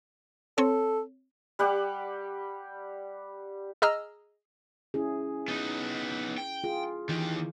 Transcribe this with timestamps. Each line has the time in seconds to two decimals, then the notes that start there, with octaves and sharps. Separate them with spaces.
0.58 C4 A4 C#5
1.59 G3 G4 F#5 D6
3.82 G#4 D#5 A#5 E6 F6
4.94 C#4 E4 G#4
5.48 B3 D#4
6.38 G5
6.64 F4 G#4
7.09 D#3 E3 G4